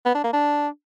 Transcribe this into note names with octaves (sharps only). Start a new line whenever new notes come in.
B3
D4
A#3
D4